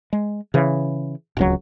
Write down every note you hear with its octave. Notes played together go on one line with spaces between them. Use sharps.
G#3
C#3 E3
D1 C#2 F#3